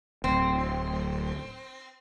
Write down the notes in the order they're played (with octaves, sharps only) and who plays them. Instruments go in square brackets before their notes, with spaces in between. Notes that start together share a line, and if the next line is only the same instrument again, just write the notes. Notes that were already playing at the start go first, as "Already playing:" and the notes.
[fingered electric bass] D1 [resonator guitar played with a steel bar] C4